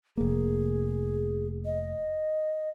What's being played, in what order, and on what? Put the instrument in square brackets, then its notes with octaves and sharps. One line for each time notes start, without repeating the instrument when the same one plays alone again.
[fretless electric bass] F1 A#3 [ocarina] G#4
[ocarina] D#5